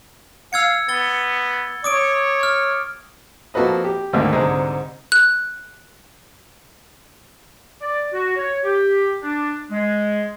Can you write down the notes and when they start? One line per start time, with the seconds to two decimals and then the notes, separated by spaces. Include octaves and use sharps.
0.53 F5 E6 G#6 C#7
0.89 B3 A6 G7
1.84 C#5 D6 D#6 D7
2.43 F6
3.54 F3 A#3 F#4 A4 B4 D#5
3.84 G4
4.13 D2 G#2 D3 D#3 A3 A#3
4.32 C2 G#2 D3 G#3 G#4
5.12 F#6
7.81 D5
8.13 F#4
8.36 C#5
8.64 G4
9.23 D4
9.71 G#3